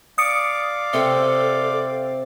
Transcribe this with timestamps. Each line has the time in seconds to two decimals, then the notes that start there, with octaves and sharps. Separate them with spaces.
0.18 D5 F5 D6 D#6 C#7 D7
0.93 C3 C4 A4